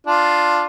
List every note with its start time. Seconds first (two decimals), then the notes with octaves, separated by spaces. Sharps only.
0.07 D4 F4